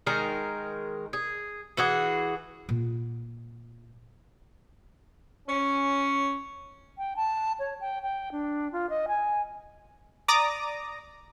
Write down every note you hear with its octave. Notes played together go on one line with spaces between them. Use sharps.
D#3 G#3 A#4
G#4
E3 F#4 G#4
A#2 F4
C#4
G5
A5
C#5
G5
G5
D4
F4
D#5
G#5
D5 A#5 D6 D#6 A#6